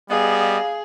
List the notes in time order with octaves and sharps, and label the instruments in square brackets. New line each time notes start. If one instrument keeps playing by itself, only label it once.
[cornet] G3 [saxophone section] B3 D#5 [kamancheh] G#4 [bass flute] F5